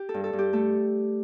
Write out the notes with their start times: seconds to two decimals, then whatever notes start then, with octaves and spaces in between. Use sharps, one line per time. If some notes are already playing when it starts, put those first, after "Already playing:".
Already playing: G4
0.09 A4
0.14 G2
0.24 A4
0.33 G2
0.39 G4
0.53 A3 A4